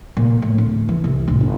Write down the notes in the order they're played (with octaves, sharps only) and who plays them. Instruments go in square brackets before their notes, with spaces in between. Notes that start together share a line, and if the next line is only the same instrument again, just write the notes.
[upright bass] A#2
A2
D1
E3
C2
D1
G1